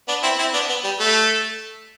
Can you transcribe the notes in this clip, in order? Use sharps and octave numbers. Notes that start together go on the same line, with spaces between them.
B3 D4
C4 E4
C4 E4
B3 D4
B3
G3
A3